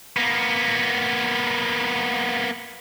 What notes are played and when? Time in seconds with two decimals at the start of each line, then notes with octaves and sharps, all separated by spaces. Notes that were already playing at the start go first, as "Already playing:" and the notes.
0.17 A#3 B3